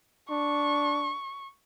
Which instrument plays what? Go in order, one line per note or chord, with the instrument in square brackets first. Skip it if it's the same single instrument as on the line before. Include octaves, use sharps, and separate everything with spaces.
[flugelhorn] D4 [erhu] C#6